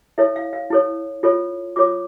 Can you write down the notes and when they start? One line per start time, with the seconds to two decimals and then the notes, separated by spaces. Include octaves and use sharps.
0.18 E4 A4 C#5 E5
0.36 F5
0.53 F5
0.70 E4 A4 C#5
1.23 F4 A4 C#5
1.76 F4 A4 C#5 D6